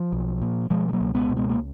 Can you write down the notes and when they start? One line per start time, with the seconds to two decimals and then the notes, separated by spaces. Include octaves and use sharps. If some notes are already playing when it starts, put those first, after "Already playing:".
Already playing: F3
0.12 B1
0.42 A#2
0.70 B2 F3 G#3
0.89 G#3
0.93 F#3 A#3
1.00 C#2
1.15 G#3 B3
1.30 B2
1.37 G#3 B3
1.49 A#3